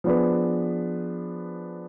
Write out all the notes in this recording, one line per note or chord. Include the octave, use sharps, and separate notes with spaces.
F3 B3 D4 G#4 B4